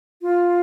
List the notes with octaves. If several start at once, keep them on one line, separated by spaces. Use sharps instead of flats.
F4